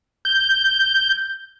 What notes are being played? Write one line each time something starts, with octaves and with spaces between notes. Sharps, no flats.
G6